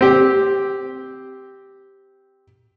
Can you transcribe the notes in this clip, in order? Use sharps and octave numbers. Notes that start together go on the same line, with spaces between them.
C4 G4